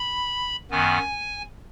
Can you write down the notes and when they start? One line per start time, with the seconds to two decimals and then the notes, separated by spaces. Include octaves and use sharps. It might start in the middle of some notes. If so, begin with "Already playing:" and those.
Already playing: B5
0.71 F#2 D#3 B3 G#5